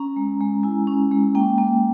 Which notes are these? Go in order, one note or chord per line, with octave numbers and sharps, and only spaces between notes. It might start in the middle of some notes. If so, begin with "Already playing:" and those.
Already playing: C#4 A#5
G#3
G#3
E4 G#5
C#4
G#3
A#3 G5
A#3